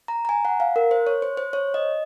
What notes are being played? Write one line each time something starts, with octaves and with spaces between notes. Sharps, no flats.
A#5
A#5
G#5
F#5
F5
A#4
C5
C#5
C5
C5
C#5
D#5